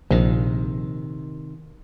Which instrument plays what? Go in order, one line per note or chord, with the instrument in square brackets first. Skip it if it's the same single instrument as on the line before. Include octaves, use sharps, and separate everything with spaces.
[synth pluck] A#1 [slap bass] C3 D#3